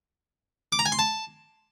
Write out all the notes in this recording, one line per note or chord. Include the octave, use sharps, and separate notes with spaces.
D6
A#5
G#5
C6
A5